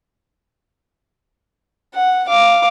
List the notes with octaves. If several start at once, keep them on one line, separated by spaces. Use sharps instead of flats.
F#5
F5 D6